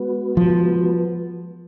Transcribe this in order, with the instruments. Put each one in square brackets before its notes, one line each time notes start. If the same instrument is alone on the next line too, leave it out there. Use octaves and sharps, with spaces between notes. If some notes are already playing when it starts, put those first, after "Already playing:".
Already playing: [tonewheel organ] G#3 B3 F#4 B4
[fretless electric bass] F3